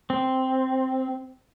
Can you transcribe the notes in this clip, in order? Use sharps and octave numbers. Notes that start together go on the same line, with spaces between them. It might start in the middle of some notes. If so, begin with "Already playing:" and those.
C4